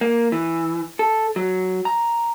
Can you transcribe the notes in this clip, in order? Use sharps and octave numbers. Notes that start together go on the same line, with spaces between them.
A#3
E3
A4
F#3
A#5